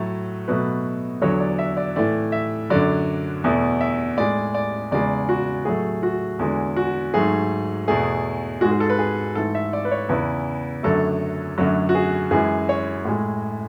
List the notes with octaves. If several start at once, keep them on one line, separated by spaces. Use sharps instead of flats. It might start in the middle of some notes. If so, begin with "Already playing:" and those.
Already playing: A2 F#3 A3
B2 F#3 A3 B4
E2 D3 F#3 C#5
D5
E5
D5
A2 E3 A3 D5
E5
F#2 D3 F#3 D5
E2 B2 A3
E5
A2 G#3 D5
D5
E2 C#3 G#3 D5
F#4
A2 F#3 A3 G#4
F#4
E2 D3 G#3
F#4
G#2 F#3 A3 G#4
E2 B2 A3 G#4
G#2 G#3 F#4
G#4
A4
B4
G#4
G#2 E3 A3 A4
E5
D5
B4
C#5
E2 C#3 E3 B4
F#2 D3 F#3 A3 A4
F#2 D3 F#3 A3
F#4
G#4
F#2 E3 G#3 G#4
C#5
A2 G#3